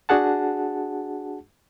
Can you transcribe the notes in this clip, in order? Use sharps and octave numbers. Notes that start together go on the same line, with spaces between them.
D4 F#4 G#4 F#5 A5